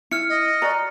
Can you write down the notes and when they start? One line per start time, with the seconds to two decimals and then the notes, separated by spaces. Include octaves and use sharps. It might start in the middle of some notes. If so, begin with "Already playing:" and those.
0.11 E4 F6 C#7
0.29 D#5
0.62 F#4 D5 A#5